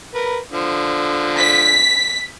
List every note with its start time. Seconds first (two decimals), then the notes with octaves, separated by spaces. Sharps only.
0.14 A#4 B4
0.52 D3 F3
1.39 B6